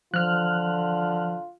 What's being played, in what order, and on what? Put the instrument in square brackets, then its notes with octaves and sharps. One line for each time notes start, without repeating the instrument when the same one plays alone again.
[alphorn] D3 [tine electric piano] F3 [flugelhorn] F4 [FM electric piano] F6 F#6